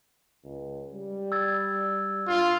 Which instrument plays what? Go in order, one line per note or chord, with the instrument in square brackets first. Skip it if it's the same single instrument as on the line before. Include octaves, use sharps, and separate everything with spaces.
[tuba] C#2
G3
[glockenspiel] E6 G#6 A6
[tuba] G2 [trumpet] F4